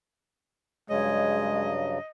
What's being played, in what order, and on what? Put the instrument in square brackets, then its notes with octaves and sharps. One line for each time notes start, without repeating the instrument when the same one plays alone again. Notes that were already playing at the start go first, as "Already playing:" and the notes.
[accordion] G2 C#3 F#3 [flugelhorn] G#3 [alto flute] C#5 [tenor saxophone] D#5